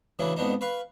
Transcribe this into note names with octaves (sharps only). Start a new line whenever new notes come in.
C#3 E3 F#3 A3 D4
F2 G#2 B3 D4 D#4
B4 F5 C#6